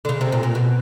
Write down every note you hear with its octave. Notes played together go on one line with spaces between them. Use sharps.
D3
C#3
C3
A#2
A#2
B2